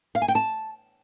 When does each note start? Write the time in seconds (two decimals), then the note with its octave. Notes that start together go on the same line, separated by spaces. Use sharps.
0.15 F5
0.22 G#5
0.28 G5
0.35 A5